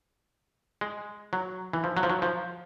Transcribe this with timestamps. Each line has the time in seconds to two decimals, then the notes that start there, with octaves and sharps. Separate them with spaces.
0.81 G#3
1.33 F#3
1.73 E3
1.84 F3
1.97 F#3
2.03 F3
2.10 F#3
2.22 F3